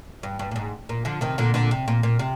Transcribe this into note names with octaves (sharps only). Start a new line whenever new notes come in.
G2
G2
A#2
G#2
A#2
D3 F3
C3 D#3
A#2 D3
A#2 D3
C3
A#2
A#2
C3